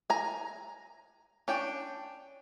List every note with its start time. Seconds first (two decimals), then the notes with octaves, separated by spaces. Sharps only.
0.10 G#5 A#5
1.48 C#4 D4 G5